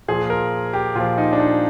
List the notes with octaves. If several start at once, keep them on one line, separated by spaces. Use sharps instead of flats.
A#2 F3 G#4
A#4
G4
A#2 F3 F4
D#4
D4
D#4